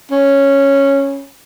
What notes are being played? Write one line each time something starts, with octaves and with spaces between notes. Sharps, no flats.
C#4